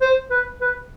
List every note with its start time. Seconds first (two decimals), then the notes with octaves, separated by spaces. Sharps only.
0.01 C5
0.30 B4
0.61 B4